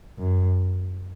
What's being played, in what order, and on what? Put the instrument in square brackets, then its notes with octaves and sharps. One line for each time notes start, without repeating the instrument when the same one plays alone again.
[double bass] F#2